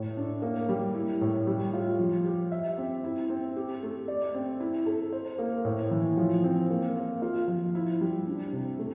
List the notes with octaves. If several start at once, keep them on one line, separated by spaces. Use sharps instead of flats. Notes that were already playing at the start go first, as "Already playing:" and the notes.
Already playing: A2 A3
D4
A#3
G3
E4
A2
G3
F4
F3
G4
E5
C4
E4
C4
G4
A3
D5
C4
E4
A4
C5
A#3
A2
E3
F3
C4
A#3
A#3
F4
F3
E4
G3
D4
C3
A3